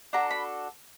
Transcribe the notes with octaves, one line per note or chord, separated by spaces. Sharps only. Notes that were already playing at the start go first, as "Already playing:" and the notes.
D4 F#4 A4 A#5
B5